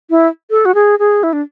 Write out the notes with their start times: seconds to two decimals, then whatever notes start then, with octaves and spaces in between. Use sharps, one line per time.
0.10 E4
0.51 A4
0.65 F#4
0.75 G#4
0.99 G#4
1.23 E4
1.33 D4